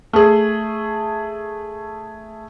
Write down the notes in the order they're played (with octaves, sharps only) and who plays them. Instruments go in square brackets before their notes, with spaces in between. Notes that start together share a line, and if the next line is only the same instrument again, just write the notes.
[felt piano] A3 G#4